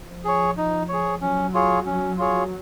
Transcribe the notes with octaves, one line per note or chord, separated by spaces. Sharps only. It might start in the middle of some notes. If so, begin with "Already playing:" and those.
Already playing: F3
G#4 C#5
D#4
G#4 C#5
F#3 C#4
F4 G#4 C#5
C#4
F4 G#4 C#5